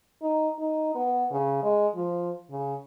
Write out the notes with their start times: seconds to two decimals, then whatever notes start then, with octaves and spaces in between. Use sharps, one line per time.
0.22 D#4
0.59 D#4
0.95 B3
1.31 C#3
1.63 G#3
1.96 F3
2.51 C#3